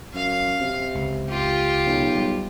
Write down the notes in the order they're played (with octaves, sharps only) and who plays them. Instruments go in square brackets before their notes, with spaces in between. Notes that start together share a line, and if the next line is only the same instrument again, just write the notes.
[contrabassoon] F#2 [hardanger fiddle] F5
[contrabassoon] C3
[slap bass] C#2
[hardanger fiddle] F4 G4
[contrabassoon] B1
[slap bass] G3